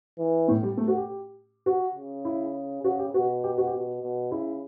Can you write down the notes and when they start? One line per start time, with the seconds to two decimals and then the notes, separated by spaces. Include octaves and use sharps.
0.19 E3
0.48 A2
0.63 G3
0.77 A3
0.88 F#4
0.97 G4
1.66 F#4
1.95 C#3
2.25 E4
2.84 C#3 F#4
2.99 G4
3.13 B2 F#4
3.44 G4
3.58 F#4
3.67 G4
3.73 B2 F#4
4.02 B2
4.31 C#3 E4